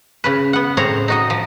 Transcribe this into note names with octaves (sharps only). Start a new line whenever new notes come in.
C#3 C#4 B4
B3 F#5
A2 C#3 C4 C5 C#5 A#5
D#4 F#4 D#5
F3